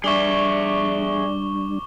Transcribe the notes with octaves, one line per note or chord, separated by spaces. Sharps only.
G3 D4 G#4 D5 E5 C#6 D6 G7